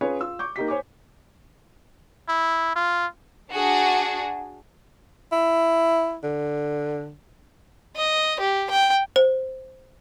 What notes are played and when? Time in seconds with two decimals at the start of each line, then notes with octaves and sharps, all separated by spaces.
0.01 C#4 F4 G#4 B4 C#5
0.20 F4 E6
0.39 C#6 D6 G6
0.56 A#3 D#4 G4 B6
0.68 C5 C#5 G#5 D6
2.29 E4
2.76 F4
3.53 D4 F#4 G#4
5.32 E4
6.23 D3
7.96 D#5
8.40 G4
8.70 G5
9.16 C5